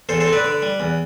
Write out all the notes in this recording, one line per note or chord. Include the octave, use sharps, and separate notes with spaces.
E2 A4 C5
A4 C5
C4
B4 D5
D3
G3
E2